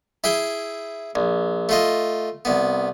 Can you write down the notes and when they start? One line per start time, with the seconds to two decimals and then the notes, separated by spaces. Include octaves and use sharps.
0.24 E4 G#4 G5
1.15 A#1
1.69 A3 F4 D#5
2.45 C2 B3